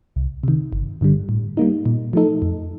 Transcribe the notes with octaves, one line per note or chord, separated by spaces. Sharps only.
C2
C3 D#3
G1
G2 D3 G3
A2
G3 A#3 D#4
A#2
F3 A3 D#4 A4
F2